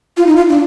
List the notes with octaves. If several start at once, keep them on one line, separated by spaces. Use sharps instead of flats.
F4
D#4
F4
D4